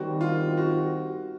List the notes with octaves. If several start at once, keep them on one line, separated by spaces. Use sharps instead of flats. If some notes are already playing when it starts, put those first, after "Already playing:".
Already playing: D#3 G3 C4 F#4
F4
F#4